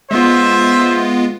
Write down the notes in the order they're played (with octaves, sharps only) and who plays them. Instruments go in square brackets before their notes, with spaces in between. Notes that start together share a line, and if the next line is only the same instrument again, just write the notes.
[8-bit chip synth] G#3 B3 F4 [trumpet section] C5 E5